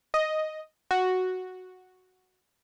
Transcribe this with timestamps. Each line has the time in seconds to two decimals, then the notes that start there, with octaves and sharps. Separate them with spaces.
0.14 D#5
0.91 F#4